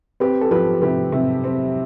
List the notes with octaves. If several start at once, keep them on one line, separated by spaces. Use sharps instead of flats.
C4 G4 B4
A4
F3 G4 B4
C3 G4 B4
C3
C4